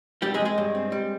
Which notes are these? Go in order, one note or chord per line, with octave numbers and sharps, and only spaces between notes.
F2 G3 G4
G#3 G#4
F2
G#3 G#4
G2
C4
G3